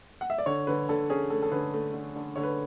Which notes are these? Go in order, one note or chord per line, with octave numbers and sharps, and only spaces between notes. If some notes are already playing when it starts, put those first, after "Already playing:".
F#5
E5
D5
D3 C#5
D3 B4
D3 A4
C#4 G#4
A3 A4
A4
D3 B4
A3
D3
D3
D3 C#5
B4